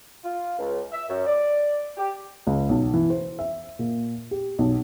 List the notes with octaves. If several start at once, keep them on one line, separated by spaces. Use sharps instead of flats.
F4
C#2
E5
F#2
D5
G4
C#2
B1
E3
C5
E5
A#2
G4
B1